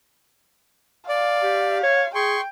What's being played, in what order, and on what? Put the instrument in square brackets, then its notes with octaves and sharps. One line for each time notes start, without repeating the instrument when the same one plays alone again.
[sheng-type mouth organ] D5 [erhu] F5
[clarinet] G4
C#5
[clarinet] G#4 [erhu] G5 [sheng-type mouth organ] C6 C#6